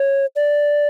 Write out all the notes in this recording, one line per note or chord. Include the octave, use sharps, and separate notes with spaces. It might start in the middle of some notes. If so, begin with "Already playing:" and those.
Already playing: C#5
D5